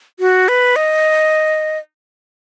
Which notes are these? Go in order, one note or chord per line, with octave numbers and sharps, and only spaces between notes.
F#4
B4
D#5